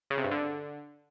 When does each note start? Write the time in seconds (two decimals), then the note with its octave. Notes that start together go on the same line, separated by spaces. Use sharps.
0.10 C#3
0.17 C3
0.24 G2
0.31 D3